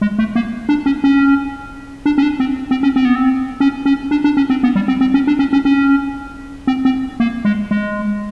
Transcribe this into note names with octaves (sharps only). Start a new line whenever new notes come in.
G#3
A3
A#3
D4
C#4
C#4
D4
C#4
D4
C4
C4
C#4
C4
B3
C4
C#4
C#4
D4
D4
C#4
C4
B3
G3
C4
C4
C#4
D4
C#4
C#4
C#4
C4
C4
A#3
G#3
G#3